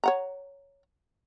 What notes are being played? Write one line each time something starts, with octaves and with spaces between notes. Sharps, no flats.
C#5 F#5 A#5